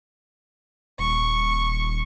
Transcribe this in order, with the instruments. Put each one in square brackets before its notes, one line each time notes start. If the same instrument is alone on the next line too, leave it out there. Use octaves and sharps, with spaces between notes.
[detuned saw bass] D#1 [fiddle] C#6